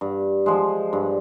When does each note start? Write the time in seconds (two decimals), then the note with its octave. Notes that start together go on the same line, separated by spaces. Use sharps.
0.01 G2
0.46 F3 G#3
0.93 G2